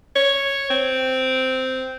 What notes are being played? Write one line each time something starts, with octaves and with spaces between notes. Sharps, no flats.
C#5
C4